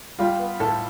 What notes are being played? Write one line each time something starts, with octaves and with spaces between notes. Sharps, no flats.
G3 F4
B3
A2 A4